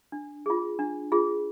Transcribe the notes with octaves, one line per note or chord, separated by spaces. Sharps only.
D4
F4 G#4
D4
F4 G#4